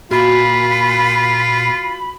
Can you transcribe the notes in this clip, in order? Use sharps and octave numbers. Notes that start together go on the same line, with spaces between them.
A#2 F4 F#4 B5